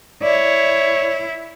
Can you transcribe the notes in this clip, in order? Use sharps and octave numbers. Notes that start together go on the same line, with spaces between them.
E4 C#5 D5